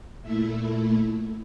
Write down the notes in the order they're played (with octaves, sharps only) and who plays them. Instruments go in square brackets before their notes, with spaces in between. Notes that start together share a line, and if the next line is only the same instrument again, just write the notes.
[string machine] A#2 A3 E4 E5